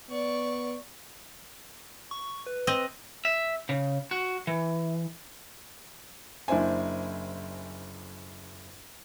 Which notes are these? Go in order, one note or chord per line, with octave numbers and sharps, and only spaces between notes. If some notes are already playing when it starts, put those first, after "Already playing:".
B3 D5 C#6
C#6
B4
C4 D#5
E5
C#3
F#4
E3
F#1 D4 E4 C5 G#5